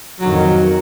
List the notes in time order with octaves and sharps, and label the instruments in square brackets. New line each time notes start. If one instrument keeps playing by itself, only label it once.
[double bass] F2 D#3 [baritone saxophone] F#3